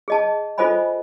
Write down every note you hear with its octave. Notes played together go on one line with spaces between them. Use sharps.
G#4 D#5 A5
F4 A4 C5 D#5 G#5 B5